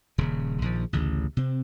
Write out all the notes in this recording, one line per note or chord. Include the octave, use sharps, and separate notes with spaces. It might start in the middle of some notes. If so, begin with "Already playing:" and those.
D#1 C#3
A#1 D#3 F3
A1 D2 C#3
C3 C4